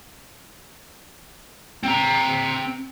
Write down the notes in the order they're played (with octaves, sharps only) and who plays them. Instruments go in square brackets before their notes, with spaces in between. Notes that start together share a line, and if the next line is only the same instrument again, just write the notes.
[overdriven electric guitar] C4 A#5